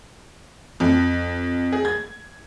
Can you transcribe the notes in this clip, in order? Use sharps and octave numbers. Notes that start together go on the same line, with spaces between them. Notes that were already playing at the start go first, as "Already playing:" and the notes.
F2
G#4
G#6